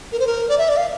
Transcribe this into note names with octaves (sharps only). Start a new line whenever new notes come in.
A#4
C5
A#4
D5
E5
D5
F5